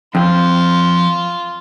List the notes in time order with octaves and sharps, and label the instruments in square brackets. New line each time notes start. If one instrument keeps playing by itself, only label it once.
[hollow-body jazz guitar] F2 C4 [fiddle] F4